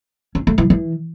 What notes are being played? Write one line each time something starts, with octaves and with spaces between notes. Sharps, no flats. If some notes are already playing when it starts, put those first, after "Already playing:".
C#4
A3
E3
E3